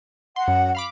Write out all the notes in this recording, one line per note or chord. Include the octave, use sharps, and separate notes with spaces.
F#5 C6
F#2
F5 B5 D6